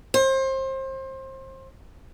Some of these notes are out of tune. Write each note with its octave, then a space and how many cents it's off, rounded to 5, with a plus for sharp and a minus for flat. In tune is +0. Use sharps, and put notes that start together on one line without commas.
C5 +25